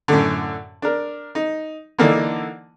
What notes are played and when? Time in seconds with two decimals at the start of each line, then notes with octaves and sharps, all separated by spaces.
0.08 F#2 A2 D3
0.82 D4 A#4
1.35 D#4
1.99 D3 E3 A#3 D4 D#4